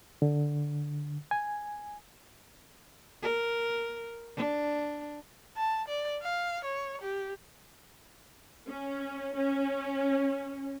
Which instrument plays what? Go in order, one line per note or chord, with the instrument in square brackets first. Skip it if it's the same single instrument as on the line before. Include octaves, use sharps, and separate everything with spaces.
[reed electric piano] D3
G#5
[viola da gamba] A#4
D4
[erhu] A5
D5
F5
C#5
G4
[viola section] C#4
C#4